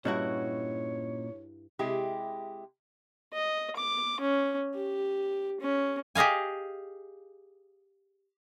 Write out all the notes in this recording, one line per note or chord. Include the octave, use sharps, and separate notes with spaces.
G2 A#2 C#4 E4 F#4 C#5 D#5
C3 G#3 E4 G4
D#5
D6
C#4
G4
C#4
G4 G#4 D#5 F5 G#5